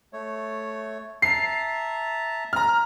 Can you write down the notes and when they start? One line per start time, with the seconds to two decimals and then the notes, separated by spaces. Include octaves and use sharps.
0.13 A3 C#5
1.22 E5 A5 A#5 C7
2.53 A#5 F6